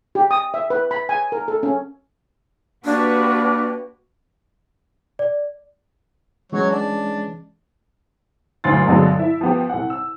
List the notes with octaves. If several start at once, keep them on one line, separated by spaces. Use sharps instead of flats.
G4
D#6
E5
B4
B5
G#5
A#4
A4
C#4
A#3 D4 F#4 G4 B4
D5
E3 F#3 G#3 C#4 C#5
D4
G1 D2 F#3 C6 A6
G2 B2 D3 F#3 G#3
E4 E5
F3 B3 G4
C2 F#5
E6